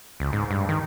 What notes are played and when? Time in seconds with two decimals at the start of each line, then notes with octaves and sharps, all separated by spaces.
0.20 C#2
0.33 G#2
0.51 G2
0.69 D#3